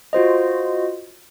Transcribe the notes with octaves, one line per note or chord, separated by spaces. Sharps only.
F4 F#4 C5 D#5